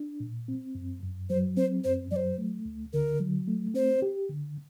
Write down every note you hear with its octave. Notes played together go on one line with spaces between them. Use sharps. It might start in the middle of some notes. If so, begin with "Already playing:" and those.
Already playing: D4
A#2
C4
F#2
F#2
F#3 C5
C4 C5
F#2 C5
F#3 C5 D5
A3
D2
D3 A#4
F#3
A3
C4 C5
G4
D3